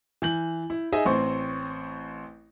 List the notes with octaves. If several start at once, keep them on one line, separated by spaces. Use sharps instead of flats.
E3 G6 F#7
E4
D#4 G#4 D#5 E5 G#5
A1 C4 C5 C#6